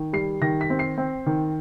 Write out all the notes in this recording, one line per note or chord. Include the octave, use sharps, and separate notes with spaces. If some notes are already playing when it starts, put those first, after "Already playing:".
Already playing: D#3
G3 C7
D#3 A#6
B6
C4
C7
C4
D#3